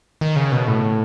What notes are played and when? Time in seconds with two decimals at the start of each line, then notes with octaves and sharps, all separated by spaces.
0.21 D#3
0.36 C#3
0.52 B2
0.68 A2